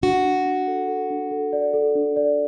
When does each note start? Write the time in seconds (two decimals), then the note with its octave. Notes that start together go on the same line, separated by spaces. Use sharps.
0.03 D4 F#4
0.25 D4
0.46 D4
0.67 A4
0.88 A4
1.10 D4
1.31 A4
1.53 D5
1.74 A4
1.95 D4
2.16 D5